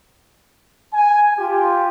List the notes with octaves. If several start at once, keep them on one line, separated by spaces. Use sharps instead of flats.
G#5
F4 G4